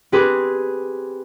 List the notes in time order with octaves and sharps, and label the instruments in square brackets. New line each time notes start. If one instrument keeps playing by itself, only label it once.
[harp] C4 G4 G#4 B4